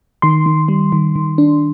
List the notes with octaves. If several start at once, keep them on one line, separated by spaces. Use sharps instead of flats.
D#3 C6
D#3
G3
D#3
D#3
D4